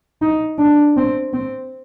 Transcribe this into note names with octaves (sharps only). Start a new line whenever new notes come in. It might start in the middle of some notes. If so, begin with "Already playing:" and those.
D#4
D4
C4
C4